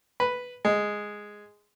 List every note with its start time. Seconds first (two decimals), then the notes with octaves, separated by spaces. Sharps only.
0.20 B4
0.65 G#3